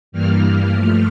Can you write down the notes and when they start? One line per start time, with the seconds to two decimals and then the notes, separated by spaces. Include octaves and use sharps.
0.12 G2 E3 G3 A#3 F6
0.71 G2 F3 A3